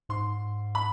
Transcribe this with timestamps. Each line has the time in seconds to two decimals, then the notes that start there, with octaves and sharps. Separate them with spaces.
0.09 G#2 C6
0.75 B5